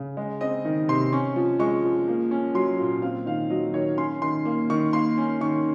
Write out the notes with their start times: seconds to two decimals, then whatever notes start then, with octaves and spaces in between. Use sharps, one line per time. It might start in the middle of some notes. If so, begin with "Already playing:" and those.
Already playing: C#3
0.17 G#3
0.41 C4 D#5
0.65 D#3
0.88 C3 C6
1.12 C#4 C#6
1.36 F3
1.59 G#3 C#6
1.84 F3
2.08 A#3
2.31 C#4
2.55 F#3 C6
2.79 A#2
3.02 C4 F5
3.26 D#3 F5
3.50 F#3 D#5
3.74 D#3 C#5
3.97 C#4 C6
4.22 D#3 C6
4.45 A#3
4.70 D#3 C#6
4.93 A#3 C6
5.18 C#4
5.41 D#3 C#6